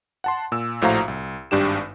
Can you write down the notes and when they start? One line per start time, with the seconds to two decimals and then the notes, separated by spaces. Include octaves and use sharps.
0.24 F#5 A5 C6
0.52 A#2 E6
0.82 A#1 A2 F#4 C5 F5 A#5
1.08 C2
1.51 G#1 G2 D4 G4 E7